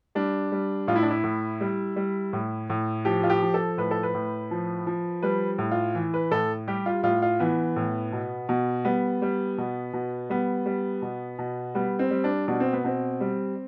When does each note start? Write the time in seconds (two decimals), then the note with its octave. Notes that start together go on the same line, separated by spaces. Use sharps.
0.15 G3 D4
0.52 G3
0.88 A2 F4
0.96 E4
1.02 D4
1.10 E4
1.24 A2
1.61 G3
1.96 G3
2.33 A2
2.70 A2
3.05 F3 G4
3.23 F4
3.30 G4
3.42 F3
3.54 A4
3.78 A2 B4
3.91 A4
4.03 B4
4.15 A2
4.51 F3
4.87 F3
5.22 G3 B4
5.58 A2
5.71 F4
5.95 E3
6.14 B4
6.31 A2 A4
6.68 G3 G4
6.86 F4
7.03 A2 F4
7.22 F4
7.40 E3 B3
7.76 A2
8.12 B2
8.49 B2
8.85 G3 B3
9.22 G3
9.58 B2
9.93 B2
10.30 G3 B3
10.66 G3
11.02 B2
11.39 B2
11.75 G3 B3
11.99 C4
12.11 G3
12.24 D4
12.48 B2 D4
12.60 C4
12.73 B3
12.84 B2 C4
13.21 G3